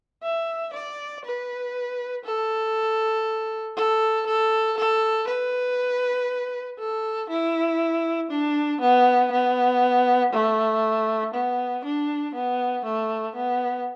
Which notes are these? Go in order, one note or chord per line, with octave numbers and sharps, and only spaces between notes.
E5
D5
B4
A4
A4
A4
A4
B4
A4
E4
D4
B3
B3
A3
B3
D4
B3
A3
B3